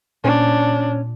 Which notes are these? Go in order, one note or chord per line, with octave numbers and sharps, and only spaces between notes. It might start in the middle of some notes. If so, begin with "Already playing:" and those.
A#2 C#4 D4 C5 C#5